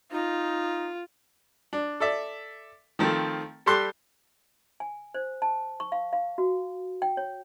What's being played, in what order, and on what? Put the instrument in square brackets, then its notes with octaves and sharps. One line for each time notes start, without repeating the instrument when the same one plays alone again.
[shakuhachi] D#4 [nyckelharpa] F4
[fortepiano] D4
A4 D5 E5
D#3 F3 A3 C4
G3 G4 A4 C6 F#6
[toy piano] G#5
C5
A5
C#6
F5
F5
F#4
G5
C#5